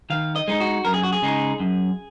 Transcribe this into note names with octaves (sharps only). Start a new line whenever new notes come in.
D#3 F5
D#5
G#3 D#4
F#4
F#2 A#4
G#4
F#4
G#4
C#3 G#3 D#4
F#2